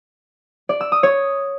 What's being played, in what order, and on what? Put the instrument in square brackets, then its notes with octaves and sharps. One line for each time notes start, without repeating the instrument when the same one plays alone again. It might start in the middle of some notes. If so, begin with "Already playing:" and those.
[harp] D5
E6
D#6
C#5